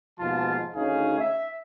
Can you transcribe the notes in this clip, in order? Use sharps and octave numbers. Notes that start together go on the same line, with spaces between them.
D#2 G#2 B2 F3 F4 A5
D2 D#3 C#4 D#4 G#4 F5
E5